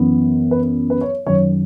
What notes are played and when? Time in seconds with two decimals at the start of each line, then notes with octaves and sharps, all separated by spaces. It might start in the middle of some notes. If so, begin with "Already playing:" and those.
Already playing: F#2 E3 B3
0.51 B4
0.90 B4
1.01 C#5
1.26 F#2 D#3 F#3 C#4 C#5